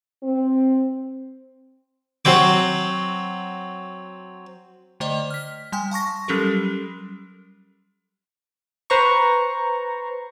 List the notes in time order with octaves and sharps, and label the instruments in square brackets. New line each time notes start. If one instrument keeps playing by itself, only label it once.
[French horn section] C4
[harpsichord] F#3 C4 D6
[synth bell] D3 A3 C5 D5 D#5
F6 B6
G3 G5 G#5
F5 A5 C#6 A#6
F#3 G3 C#4 G4 A4 A#4
[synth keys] B4 C5 A#5 C#6